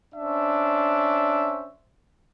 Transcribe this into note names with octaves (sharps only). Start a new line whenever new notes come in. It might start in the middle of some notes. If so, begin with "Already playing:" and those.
C#4 D4 C5 E5